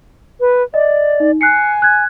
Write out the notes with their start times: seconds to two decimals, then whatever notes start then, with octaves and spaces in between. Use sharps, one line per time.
0.40 B4
0.74 D5 D#5
1.20 D#4
1.41 G#5 F#6 C7 C#7
1.82 F#6 G#6